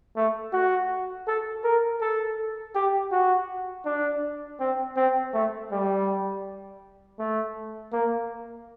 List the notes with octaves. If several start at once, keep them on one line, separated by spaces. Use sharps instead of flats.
A3
F#4
A4
A#4
A4
G4
F#4
D4
C4
C4
A3
G3
A3
A#3